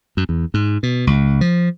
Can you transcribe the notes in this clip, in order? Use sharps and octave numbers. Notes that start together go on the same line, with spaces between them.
F#2
E2
G#2
B2
C#2
F3